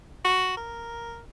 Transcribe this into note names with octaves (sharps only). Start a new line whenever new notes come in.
F#4
A#4